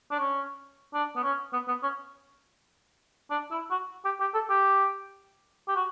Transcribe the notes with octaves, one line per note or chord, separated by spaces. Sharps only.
D4
C#4
D4
B3
C#4
B3
B3
C#4
D4
E4
F#4
G4
G4
A4
G4
G4
F#4